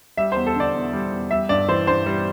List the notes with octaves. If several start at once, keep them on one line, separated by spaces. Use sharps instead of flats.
G3 E5
E2 C5
A4
D3 D5
E2
G3
E2
G3 E5
G2 D5
E3 C5
G2 C5
G3